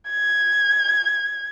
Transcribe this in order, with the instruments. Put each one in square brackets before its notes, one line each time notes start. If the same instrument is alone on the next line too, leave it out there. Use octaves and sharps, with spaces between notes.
[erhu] G#6